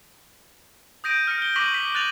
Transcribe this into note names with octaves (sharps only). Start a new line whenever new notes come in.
D#6 G6 A#6 D7 D#7
F6 A#6 C#7
G7
C#6 D6 A#6 B6 D#7 F#7
B6
F#6 A6 D#7 F7 F#7